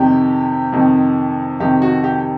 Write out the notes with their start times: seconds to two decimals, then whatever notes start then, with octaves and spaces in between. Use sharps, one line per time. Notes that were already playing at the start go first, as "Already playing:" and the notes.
Already playing: F2 C3 D#3 G4
0.72 F2 C3 D#3
1.60 F2 C3 D#3 G4
1.82 F#4
2.04 G4